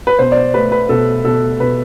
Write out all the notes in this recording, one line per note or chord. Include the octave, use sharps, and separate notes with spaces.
B4
B2 C5
D5
C5
A3 B4
B4
B2 A4
B2 A4
B2 B4